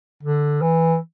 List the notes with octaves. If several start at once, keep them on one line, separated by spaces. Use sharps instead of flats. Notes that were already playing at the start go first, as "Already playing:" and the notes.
D3
E3